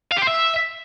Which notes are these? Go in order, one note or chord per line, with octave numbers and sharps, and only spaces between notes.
F5
G4
C5
E5